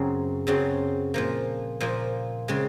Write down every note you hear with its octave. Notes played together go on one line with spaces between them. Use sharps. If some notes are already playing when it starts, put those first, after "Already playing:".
Already playing: F#2 C#3 F#3 C4 A#5
F#2 C#3 F#3 C4
A#2 F3 A#3
A#2 F3 A#3
C#3 G#3 C4